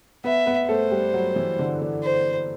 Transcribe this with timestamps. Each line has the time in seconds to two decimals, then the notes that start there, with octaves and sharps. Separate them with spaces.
0.24 B3 B4 E5
0.46 B3 B4
0.69 A3 A4 C5
0.91 G3 G4
1.14 F#3 F#4
1.36 E3 E4
1.58 D3 D4
1.81 D3 D4
2.04 C5